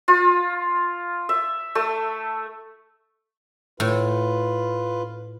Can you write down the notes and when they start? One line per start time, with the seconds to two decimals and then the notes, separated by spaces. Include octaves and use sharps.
0.08 F4
1.29 E5
1.75 A3
3.80 A2 F4 B4